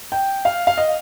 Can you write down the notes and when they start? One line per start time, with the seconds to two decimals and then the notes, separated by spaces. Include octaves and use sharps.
0.12 G5
0.45 F5
0.67 F5
0.78 D#5